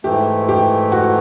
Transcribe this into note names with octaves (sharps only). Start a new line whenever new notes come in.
G#2 E3 A3 G4
G4
F#4